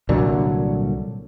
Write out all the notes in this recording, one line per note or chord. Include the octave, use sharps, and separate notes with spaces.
C2 A#2 D3 F#3